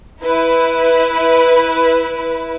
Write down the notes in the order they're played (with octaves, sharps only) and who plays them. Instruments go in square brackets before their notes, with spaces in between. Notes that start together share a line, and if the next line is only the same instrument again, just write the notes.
[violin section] E4 B4